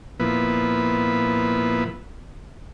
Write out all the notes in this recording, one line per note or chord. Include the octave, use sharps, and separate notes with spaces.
A#2 F3 B3 E4 B4